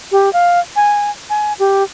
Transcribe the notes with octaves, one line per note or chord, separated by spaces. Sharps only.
G4
F5
G#5
G#5
G4